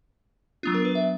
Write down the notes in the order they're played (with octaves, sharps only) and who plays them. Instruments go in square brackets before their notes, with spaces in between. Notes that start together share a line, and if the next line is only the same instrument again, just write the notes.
[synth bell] F#3 B3 D4 F4
A#4
B4
E5